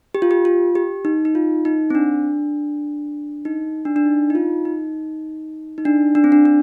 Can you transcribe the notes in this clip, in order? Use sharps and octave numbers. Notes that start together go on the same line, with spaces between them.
G4
F4
G4
F4
G4
D#4
D#4
F4
D#4
C4
D4
D#4
D4
D4
D#4
D#4
F4
D#4
D#4
D4
D4
C4
D4
D4